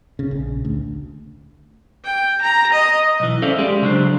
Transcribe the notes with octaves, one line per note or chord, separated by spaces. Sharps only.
C#3
A#1
D2
G5
A#5
D#5
B1 E3
C#4 A4 C5 D5 E5 F5
G#3 G4 D5
C#3 F#3 D4 C5